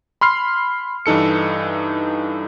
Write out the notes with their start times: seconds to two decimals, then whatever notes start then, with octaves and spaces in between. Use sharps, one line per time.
0.21 B5 C6 F6 C7
1.06 G2 E3 D#4 A4 C#7